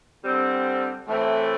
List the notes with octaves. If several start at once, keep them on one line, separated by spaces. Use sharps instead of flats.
D3 G3 C4
A2 E3 A3 C4